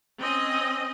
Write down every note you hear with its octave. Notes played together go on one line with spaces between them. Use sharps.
C4 C#4 D#5